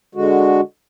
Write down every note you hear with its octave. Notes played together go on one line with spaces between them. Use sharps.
D3 G#3 F#4